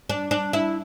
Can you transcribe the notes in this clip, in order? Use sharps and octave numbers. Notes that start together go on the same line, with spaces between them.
D4
D4
E4